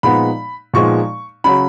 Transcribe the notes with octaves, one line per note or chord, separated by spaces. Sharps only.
A#2 F3 G#3 B3 D#4 B5
A#2 F3 G#3 B3 D#4 C#6
C#3 F#3 C#4 B5